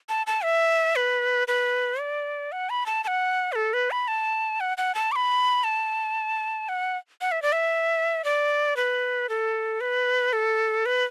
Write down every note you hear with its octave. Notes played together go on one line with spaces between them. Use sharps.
A5
A5
E5
B4
B4
D5
F#5
B5
A5
A5
F#5
B4
A4
B4
B5
A5
F#5
F#5
A5
D6
B5
A5
F#5
F#5
E5
D5
E5
D5
B4
A4
B4
A4
B4